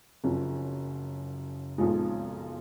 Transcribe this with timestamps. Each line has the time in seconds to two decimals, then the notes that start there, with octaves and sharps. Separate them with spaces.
0.24 F#1 F#2 F3
1.78 B1 A#2 F3 G#3 D#4